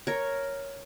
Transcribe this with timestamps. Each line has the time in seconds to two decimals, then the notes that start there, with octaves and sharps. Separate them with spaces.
0.07 A#4 C#5